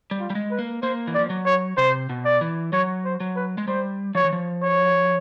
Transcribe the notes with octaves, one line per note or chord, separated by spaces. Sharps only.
G3
F4
G3
G#3
B4
A#3
A#3 C5
E3
D5
F3
F#3
C#5
C3 C5
B2
D5
E3
F#3 C#5
C5
F#3
B4
G#3
G3 C5
F3 C#5
E3
F3
C#5